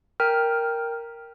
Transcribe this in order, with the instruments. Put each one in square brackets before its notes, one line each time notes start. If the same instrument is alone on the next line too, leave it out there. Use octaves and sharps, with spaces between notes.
[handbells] A#4 G5 F6